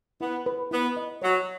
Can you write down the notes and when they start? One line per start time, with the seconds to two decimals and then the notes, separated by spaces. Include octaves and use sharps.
0.21 B3 E4
0.46 B4
0.71 B3 E4
0.97 D#5
1.22 F#3 C#5